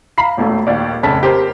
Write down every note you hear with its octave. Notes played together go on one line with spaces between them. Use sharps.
F5 A#5 B5 C7
E1 A#1 A3
A#1 D#2 D5
F1 C#3 A5 B6
G4 A#4 C5